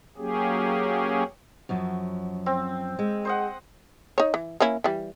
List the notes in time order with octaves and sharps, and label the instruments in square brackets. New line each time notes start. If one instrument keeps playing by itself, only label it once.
[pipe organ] F#3 A#3 C#4 G4 G#4
[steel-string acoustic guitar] F#2 F3 F#3
[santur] C4
[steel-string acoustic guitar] G#3
[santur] C5 D#5 F#5
[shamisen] D#4 C#5
E3
A#3 C#4 E4
E3 G3